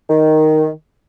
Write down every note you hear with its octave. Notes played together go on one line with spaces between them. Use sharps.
D#3